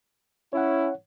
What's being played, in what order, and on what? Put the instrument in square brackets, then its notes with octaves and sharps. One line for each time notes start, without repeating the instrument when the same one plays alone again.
[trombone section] C#4 E4 [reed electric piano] C#5 F#5